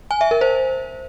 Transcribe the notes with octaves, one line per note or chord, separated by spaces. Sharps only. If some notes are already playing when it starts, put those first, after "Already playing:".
G#5
E5
A#4
C5